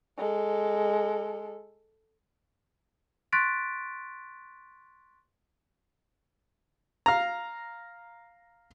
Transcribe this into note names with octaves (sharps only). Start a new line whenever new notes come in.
G#3 A4
C6 C#6 F#6 A6 B6 D7
F5 A#5